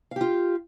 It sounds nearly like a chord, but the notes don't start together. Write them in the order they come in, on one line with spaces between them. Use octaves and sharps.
F5 G4 F4